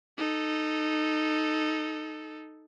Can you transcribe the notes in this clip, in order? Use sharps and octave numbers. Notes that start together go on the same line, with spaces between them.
D#4 A4